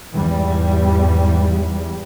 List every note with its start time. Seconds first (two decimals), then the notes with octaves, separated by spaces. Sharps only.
0.14 E2 G#2 G3